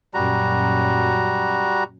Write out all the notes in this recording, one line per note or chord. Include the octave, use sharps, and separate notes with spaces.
F#2 A#2 G3 F#4 A#5